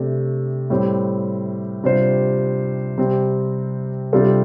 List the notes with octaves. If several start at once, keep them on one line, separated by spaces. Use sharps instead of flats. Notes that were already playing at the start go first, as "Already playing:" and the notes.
Already playing: C3 A3 D4
A2 G3 C4
C3 G3 D4 F4 C5
C3 G3 C4
C3 G3 D4 F4 A4